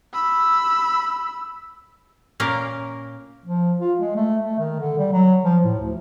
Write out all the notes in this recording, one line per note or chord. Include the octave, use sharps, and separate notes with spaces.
B5 E6
A#2 A#3 C#4 A#4 F5 G5
F3
F4
G#3
A3
A3
D#3
D3
G3
F#3
F3
A2
D2